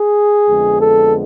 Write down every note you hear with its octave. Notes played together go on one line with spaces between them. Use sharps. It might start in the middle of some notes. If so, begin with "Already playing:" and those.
Already playing: G#4
F2 D3 G#3 B3
A4